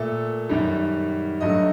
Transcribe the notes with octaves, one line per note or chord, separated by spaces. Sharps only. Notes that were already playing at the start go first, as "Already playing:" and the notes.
Already playing: A#2 A3 A4
F#2 D#3 G3
G2 F#3 A3 D#5